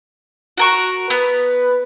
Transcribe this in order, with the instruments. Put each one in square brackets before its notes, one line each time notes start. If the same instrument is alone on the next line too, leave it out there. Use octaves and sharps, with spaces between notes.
[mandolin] F#4 A#4 C#6
[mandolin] B3 [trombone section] B4